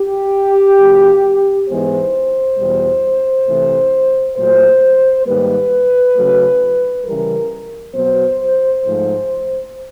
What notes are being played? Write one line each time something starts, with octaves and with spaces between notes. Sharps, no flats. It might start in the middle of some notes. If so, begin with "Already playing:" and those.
Already playing: G4
C#3 F#3 A#3
G#2 E3 G#3 B3 C5
E2 B2 G3
C3 E3 A3
A#2 F#3 A3 C5
G#2 D#3 G3 A#3 B4
C#3 F#3 A3
C#3 E3 G3 A#4
B2 F#3 B3 C5
G#2 F3 A3